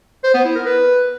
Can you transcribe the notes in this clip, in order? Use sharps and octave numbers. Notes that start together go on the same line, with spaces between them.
C5
B3
E4
A#4
B4